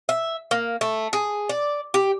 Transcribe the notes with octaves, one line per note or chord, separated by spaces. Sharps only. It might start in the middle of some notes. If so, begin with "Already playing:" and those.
E5
A#3
A3
G#4
D5
G4